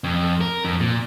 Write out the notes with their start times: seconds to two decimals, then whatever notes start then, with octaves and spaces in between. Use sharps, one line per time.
0.04 F2
0.41 A#4
0.65 F2
0.80 A#2